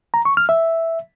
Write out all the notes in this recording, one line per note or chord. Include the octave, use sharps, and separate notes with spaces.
A#5
C#6
F6
E5